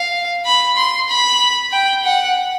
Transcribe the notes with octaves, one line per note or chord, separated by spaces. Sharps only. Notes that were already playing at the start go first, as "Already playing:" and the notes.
Already playing: F5
B5
C6
B5
G5
F#5